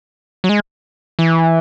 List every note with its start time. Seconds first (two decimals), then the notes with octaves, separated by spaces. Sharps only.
0.44 F#3
0.49 G#3
1.19 E3